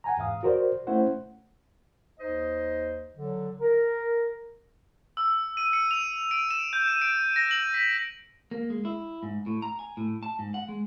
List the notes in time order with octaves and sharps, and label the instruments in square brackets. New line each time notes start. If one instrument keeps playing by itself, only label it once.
[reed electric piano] F#5 G#5 A#5
E2 G#2 F5 D#6
F#4 A#4 C5 D5
A3 C#4 E4 C5 F#5
[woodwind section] D#2 D#4 C5 D#5
D3 F#3
A#4
[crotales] E6
D#7
C#7
F7
D7
E7
G6
D#7
D7
A#6
F#7
B6
[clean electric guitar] A#3
G#3
E4
G#2
A2
A#5
G#5
A2
A5
G#2
F#5
G#3